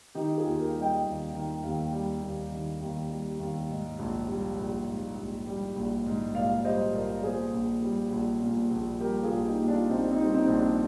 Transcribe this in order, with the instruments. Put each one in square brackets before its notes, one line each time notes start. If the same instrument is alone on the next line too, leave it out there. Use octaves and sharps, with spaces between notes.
[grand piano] D#3 D#4 G4
F4 G#4
D#2
G4 A#4
G3
D#5 G5
D#2
D#3
D#2
G3
D#2
D#3
D#2
G3
D#2
G#2
A#1
G3
A#1
G#2
A#1
G3
A#1
G#2
A#1 D5 F5
G3 C5 D#5
A#1 A#4 D5
A#2 G#4 C5
A#1
G3
A#1
A#2
A#1
G3 G4 A#4
F4 G#4
A#1
D#4 G4
A#2
D4 F4
A#1 C4 D#4
C4 D#4
G3
C4 D#4
A#1
D4